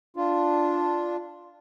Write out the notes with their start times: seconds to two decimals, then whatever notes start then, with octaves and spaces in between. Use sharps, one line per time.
0.17 D4 F4